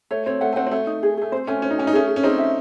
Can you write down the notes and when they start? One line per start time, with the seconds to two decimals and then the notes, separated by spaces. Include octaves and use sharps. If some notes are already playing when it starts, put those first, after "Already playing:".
0.11 A3 C#5
0.26 C4 C#5
0.41 A3 F#5
0.53 A3
0.56 C4 F#5
0.67 C4
0.71 A3 C#5
0.87 D#4
1.03 G#4
1.17 A3 G#4
1.32 C4 C5
1.47 A3 C#4 G#5
1.62 C#4 C5
1.71 D#4
1.79 C#4 G#5
1.87 D#4
1.93 A3 C#4 G#4
2.08 G#4
2.16 C#4
2.23 C4 D#4 G#4
2.39 E5